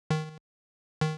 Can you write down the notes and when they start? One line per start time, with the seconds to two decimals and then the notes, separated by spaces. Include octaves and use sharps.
0.10 D#3
1.01 D#3